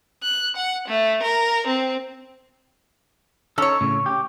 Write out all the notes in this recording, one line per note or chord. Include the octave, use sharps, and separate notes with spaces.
F#6
F#5
A3
A#4
C4
C#4 D#4 A4 C#5
A2 C#3
G4